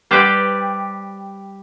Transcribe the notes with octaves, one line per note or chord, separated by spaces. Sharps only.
G3 G4 B4 C5 D5 G5